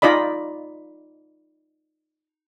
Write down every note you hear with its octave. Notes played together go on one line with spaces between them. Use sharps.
D#4 F4 D5 D#5 B5